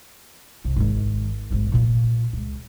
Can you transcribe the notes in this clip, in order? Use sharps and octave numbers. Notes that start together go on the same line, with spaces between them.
C2
G#1 D#3
G#1 B3
A#2 F4
C#2